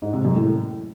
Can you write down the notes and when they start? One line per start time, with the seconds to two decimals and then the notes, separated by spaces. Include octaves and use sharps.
0.02 G#2
0.13 C3
0.25 F#2
0.36 A2